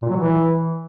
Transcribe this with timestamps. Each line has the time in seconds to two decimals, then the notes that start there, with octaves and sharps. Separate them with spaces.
0.02 A#2
0.09 F#3
0.17 E3